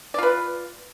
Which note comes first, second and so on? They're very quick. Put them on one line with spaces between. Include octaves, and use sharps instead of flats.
D5 F4 B4